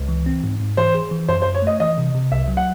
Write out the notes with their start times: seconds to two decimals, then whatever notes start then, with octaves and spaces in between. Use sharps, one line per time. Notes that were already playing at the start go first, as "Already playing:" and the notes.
Already playing: C#2
0.09 E3
0.26 C4
0.44 G#2
0.60 G#2
0.77 E3 C5
0.94 G#4
1.11 E3
1.29 F#2 C5
1.42 C5
1.46 F#2
1.54 C#5
1.62 A3 D#5
1.80 E3 D#5
1.98 C3
2.15 C3
2.32 C2 E5
2.48 F#3
2.57 F#5